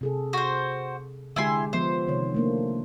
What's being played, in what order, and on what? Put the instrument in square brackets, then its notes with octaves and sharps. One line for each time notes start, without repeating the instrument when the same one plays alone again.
[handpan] C3 G#4 A4
[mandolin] F#4 C5
[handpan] D3 G#3 G4 [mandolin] E4 G#5 C6
[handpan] F3 B3 E5 [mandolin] C5
[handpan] C3 D#3 C#5
A3 A#3 D4